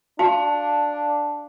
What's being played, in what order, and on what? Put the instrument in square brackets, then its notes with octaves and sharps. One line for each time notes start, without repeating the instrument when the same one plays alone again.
[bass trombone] D4 [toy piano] F#4 [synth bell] F5 A5